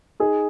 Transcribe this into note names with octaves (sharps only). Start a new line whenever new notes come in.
D#4 G#4